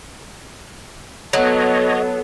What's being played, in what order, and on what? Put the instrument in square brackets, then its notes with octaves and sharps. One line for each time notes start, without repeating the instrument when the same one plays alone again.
[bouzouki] F#3 [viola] B3 A4 [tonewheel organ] C#5 D#5